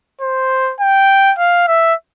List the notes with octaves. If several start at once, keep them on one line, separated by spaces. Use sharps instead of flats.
C5
G5
F5
E5